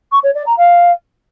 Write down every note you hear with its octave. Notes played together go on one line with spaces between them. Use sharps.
C#6
C#5
D5
A#5
F5